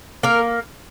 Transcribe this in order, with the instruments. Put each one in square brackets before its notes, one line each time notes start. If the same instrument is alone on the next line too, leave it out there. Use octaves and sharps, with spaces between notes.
[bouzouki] A#3 A#4